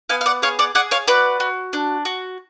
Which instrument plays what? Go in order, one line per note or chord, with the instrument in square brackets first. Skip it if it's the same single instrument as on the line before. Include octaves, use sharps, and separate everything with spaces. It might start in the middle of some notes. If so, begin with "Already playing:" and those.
[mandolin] B3 F5 G#5
F5
D5 F#5
G#4 C#5 F5
D5 F#5
G#4 D5 F#5
C#5 F5
F#4 B4 D5
F#4
D4
F#4